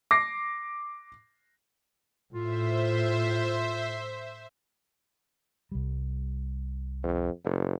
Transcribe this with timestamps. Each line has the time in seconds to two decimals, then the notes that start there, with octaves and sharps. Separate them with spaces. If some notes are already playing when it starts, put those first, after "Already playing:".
0.11 D6 A#6 C7
2.34 A2 F4 C5 E5
5.72 C2 G3
7.03 F2
7.45 F#1